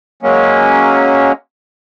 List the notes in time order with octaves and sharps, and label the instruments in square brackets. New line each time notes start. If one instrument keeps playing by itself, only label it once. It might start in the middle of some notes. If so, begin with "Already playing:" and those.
[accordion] F#3 G#3 A#3 C#4